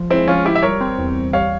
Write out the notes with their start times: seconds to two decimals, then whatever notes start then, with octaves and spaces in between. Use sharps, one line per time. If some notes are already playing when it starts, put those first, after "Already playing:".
Already playing: F3
0.10 G#3 C4 E4
0.28 F3 C#4 F4
0.45 F3 E4 G4
0.56 E5
0.62 G3 A#4 C#5
0.81 C4
0.98 E2
1.16 E2
1.33 G3 C#5 F5